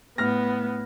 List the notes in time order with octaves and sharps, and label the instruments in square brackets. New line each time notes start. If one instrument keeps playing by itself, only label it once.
[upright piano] A2 F6 A#6 [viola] B3